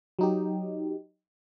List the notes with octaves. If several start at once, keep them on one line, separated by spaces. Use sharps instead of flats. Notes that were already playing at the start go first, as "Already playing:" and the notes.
F#3 D#4 G4